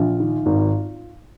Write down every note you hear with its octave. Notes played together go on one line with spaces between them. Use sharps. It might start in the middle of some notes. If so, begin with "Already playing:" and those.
Already playing: A#1 F4
D#3
G#1